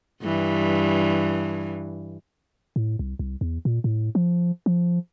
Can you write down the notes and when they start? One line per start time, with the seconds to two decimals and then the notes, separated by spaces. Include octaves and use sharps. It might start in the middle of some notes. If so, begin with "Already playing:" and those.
0.23 G2 E3
2.76 A2
2.99 C2
3.19 C2
3.41 E2
3.65 A#2
3.84 A2
4.15 F3
4.66 F3